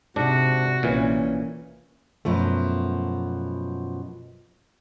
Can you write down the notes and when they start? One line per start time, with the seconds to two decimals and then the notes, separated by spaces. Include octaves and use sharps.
0.16 G#2 C3 D4 F#4
0.83 A#1 A#2 E3 C#4
2.25 F#2 B2 F3 A3